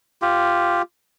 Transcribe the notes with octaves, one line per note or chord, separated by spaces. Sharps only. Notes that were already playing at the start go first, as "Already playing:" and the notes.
F4 G4